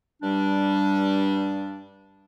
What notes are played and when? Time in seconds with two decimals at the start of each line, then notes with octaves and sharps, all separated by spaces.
0.22 G2 G3 D4